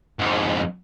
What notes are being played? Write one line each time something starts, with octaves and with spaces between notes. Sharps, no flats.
F2 G#2